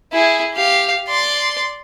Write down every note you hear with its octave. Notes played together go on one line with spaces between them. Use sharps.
E4 G#4
G4 F5
D5 C6